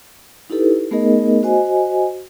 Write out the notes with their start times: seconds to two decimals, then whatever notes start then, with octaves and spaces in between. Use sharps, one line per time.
0.50 D#4 E4 G4 A4 B4
0.91 A3 B3 D#4 G#4 A#4 D#5
1.43 F#4 C5 D#5 G#5